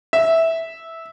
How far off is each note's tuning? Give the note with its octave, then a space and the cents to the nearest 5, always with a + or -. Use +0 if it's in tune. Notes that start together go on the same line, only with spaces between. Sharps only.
E5 -10